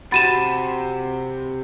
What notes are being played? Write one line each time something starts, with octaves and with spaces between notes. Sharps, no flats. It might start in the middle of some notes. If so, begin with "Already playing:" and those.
C3 F#4 F#5 B5 A6 D#7 E7